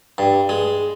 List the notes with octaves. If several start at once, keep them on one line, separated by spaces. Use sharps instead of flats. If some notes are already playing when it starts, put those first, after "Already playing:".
G2
G#3